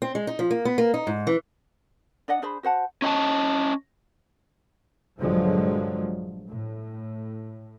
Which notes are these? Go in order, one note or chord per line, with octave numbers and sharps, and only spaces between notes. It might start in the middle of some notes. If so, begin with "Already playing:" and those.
C4
G#3
D#4
F3
A#3
B3
A#3
D#4
G#2
E3
D4 D5 D#5 F#5
D4 G#4 C5 B5
F#4 C5 F#5 A5
C#4 D#5 G5 A5
A#1 G2 D3 F3 F#3 G#3
A2